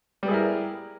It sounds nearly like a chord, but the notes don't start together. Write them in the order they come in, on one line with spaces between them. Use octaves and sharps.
G3 B3 G#4 E4 A#4